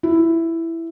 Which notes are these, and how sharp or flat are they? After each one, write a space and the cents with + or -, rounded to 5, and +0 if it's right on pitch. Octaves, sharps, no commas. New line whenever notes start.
E4 +5